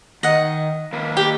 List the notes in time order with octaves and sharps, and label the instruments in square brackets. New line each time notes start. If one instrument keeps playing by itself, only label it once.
[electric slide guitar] D#3 [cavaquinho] D#5 F#5
[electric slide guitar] D#3 A#3 B4
[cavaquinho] G4